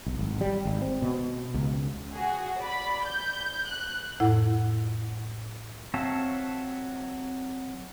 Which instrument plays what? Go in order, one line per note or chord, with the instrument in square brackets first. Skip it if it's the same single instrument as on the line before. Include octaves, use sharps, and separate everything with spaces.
[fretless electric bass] B1
G#1
G3
G#1
C4
B2
C#2
[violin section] F#4 G#4
D5 B5
G6
F#6
[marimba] F2 A2 E4 F#5
[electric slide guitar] F#3 C4 C#5 E5 F5 A5